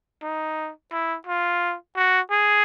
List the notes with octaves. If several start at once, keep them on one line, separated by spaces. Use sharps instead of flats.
D#4
E4
F4
F#4
G#4